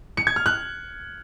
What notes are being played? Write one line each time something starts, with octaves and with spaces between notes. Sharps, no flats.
C#7
G#6
F6
F#6